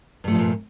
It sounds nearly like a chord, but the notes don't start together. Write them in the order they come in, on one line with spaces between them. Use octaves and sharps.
G2 A3 F3 C#3 A#2